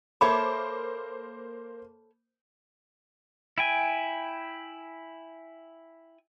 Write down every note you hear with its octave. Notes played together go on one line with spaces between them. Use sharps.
A#3 A4 C5 C#5 E5 B5 D6
E4 G5 G#5